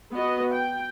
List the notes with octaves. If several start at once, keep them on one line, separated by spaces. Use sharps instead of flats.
B3 F#4 D#5
G5